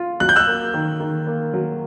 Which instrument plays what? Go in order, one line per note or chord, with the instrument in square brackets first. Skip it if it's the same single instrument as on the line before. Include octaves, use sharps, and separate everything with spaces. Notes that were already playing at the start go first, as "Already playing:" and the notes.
Already playing: [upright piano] F4
[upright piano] F#3 [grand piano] F#6
[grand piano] G6
E6 F#6
[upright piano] A#3
D#3
D#3
A#3
F#3